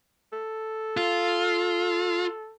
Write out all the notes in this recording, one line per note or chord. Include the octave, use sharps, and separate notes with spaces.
A4
F4